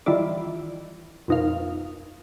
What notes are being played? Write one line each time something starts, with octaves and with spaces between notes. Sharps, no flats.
D#3 E3 G3 E4 F4 D5
F2 B2 D#4 A#4 F5